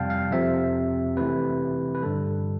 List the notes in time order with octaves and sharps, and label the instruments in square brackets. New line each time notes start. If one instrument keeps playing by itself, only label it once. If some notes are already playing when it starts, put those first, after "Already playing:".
Already playing: [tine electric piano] F2 C3 G3 F5 G5 A5
F5
F2 C3 F3 C4 E5
C3 E3 A3 B4
B4
G2 D3 G3 A4